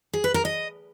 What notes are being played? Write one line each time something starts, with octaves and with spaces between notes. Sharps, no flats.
G#4
B4
A#4
D#5